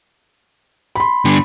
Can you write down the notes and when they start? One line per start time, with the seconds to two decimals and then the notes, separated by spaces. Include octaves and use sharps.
0.95 B5 C6
1.25 G2 D3